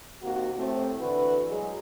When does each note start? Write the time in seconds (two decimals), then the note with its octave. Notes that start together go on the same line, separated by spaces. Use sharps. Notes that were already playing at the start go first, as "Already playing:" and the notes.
0.22 C3 D#3 A#3 F#4
0.57 A2 C3 A3 C4
1.00 D3 E3 F#4 B4
1.49 F#3 G#3 G#4